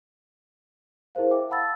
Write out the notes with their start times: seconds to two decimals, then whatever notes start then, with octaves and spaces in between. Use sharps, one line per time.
1.15 E4 G#4 A#4 C5 F5
1.31 E5 G5 D6
1.49 F5 F#5 A5 B5 E6 A6